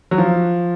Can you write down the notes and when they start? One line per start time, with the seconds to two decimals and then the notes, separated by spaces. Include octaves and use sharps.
0.11 F#3
0.18 F3